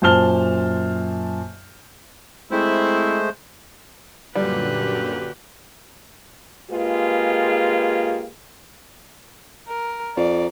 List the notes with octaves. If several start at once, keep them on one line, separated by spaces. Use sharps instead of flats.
F#2 A#2 C5 A5 F6 G7
G#3 A3 C4 E4 C5
F#2 A#2 D3 G3 F#4 G4 B4
G#3 A#3 F4 G4 G#4 B4
A#4
F2 D5